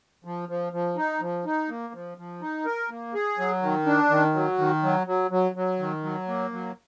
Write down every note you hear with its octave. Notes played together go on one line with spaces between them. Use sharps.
F3
F3
F3
D#4
F3
D#4
A#3
F3
F3
D#4
A#4
A#3
G#4
F#3
D#3
D4
D#3
F#3
D#3
F#3
F#3
F#3
F#3
D#3
F#3
A#3
F#3